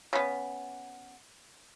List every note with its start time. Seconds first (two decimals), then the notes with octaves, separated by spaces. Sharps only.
0.13 C#3 B3